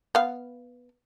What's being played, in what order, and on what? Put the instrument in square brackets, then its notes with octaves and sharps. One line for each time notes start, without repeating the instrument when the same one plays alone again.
[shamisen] B3 F5